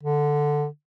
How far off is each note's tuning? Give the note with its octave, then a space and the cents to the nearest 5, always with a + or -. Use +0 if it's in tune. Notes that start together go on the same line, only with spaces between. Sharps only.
D3 +5